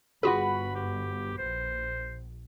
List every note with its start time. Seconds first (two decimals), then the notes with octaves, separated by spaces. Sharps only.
0.23 G1 F4 F#4 G#4 B4 B5
0.75 G4
1.38 A#1 C5